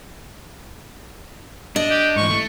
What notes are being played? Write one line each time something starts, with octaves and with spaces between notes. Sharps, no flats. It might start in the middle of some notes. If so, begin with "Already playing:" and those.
D4 D#5
G4
G#2 E3 C#6
A3